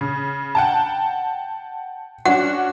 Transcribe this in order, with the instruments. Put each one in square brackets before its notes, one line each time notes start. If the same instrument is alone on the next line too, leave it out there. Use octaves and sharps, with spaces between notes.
[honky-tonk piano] C#3
F#5 G5 A5
[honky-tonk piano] C#4 D4 F#4 [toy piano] F#5